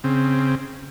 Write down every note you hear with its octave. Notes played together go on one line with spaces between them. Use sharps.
C#3 C4